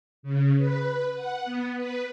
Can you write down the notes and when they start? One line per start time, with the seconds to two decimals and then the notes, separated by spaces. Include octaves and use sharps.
0.23 C#3
0.57 B4
1.14 F#5
1.45 B3
1.77 B4